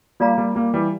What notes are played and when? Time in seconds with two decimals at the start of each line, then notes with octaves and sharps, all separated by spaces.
0.20 G3 A#3 F4 A4 D5 F5 A#5
0.38 G3 A#3
0.55 G3 A#3
0.74 E3 G3